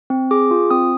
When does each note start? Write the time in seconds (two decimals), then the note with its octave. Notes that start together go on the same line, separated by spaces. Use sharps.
0.10 C4
0.31 G#4 D6
0.51 F4
0.71 C4 D#6